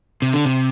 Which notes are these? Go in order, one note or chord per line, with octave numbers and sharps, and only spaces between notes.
C3
D3
C3